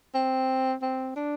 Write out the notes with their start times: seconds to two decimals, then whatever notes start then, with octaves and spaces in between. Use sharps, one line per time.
0.15 C4
0.82 C4
1.16 D4